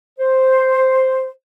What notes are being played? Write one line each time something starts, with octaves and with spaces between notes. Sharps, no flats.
C5